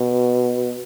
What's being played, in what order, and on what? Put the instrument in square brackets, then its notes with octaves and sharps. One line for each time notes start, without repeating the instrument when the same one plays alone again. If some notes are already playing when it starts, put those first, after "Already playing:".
Already playing: [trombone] B2